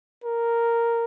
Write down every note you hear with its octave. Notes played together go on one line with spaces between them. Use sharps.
A#4